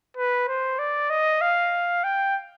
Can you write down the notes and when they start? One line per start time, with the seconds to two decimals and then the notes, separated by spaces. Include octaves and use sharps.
0.17 B4
0.48 C5
0.79 D5
1.10 D#5
1.41 F5
2.04 G5